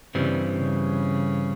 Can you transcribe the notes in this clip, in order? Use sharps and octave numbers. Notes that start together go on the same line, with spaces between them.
G2 C#3 E3 G3 C4
C#3